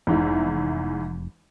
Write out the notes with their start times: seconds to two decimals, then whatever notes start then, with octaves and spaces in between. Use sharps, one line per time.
0.07 F1 E2 G#2 E4